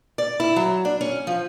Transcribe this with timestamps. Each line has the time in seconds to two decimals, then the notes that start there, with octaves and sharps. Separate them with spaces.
0.18 D5
0.40 E4
0.56 F#3
0.85 D4
1.01 C#4
1.27 F3